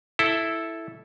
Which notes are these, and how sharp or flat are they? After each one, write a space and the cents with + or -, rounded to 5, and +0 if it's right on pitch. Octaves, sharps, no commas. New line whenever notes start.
E4 +0 A4 -5